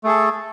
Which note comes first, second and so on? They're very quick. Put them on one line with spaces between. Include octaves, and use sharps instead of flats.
A3 G#4 A4